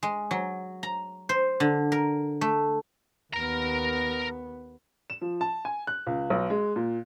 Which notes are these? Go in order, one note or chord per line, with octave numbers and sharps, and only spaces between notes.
G#3
F#3
A#5
C5
D3
A#4
A3
D#2 B3 A#4 A#5
E7
F3
A5
G#5
F#6
C#2
B1
G#3
A#2